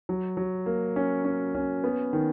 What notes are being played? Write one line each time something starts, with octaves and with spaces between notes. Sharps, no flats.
F#3
F#3
A#3
C#4
C#4
C#4
B3
D#3